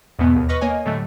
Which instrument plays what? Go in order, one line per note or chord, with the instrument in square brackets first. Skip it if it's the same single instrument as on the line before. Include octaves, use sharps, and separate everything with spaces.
[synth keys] E2 G#2 B2 B3
D#2
B4 D#5 C#6 F6 A#6
A#3 C#5 D#5 G#5
A2 D3 F#3 G3 A3